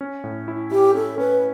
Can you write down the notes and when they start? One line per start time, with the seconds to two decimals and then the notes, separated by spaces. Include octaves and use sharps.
0.01 C#4
0.24 A2
0.48 E4
0.71 E4 G4
0.94 C#4 A4
1.18 C#4 B4